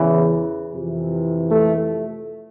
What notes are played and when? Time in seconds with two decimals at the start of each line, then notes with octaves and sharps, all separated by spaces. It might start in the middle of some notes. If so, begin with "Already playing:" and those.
Already playing: E2 C#3 E3
0.73 F2 C3 E3
1.51 A3